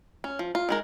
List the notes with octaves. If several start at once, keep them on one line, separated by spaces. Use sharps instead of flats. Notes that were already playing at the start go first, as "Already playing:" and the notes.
C#4
F3
F4
D#3 G#3 A#4